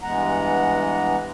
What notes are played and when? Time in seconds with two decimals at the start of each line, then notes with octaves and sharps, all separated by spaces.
0.02 G2 E3 G#3 B3 F#5 A#5